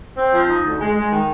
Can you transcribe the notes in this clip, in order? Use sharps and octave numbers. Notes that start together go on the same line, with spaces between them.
C4
F3
D#4
D2
G#3
G#3
D#3